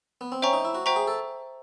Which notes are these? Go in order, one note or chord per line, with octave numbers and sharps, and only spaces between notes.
B3
C4
C#4 C5 E5 G5 A#5 C#6
D#4
E4
F#4
F#4 C5 E5 G5 A#5 C#6
G#4
A4